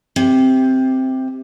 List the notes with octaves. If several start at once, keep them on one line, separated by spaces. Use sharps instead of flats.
C3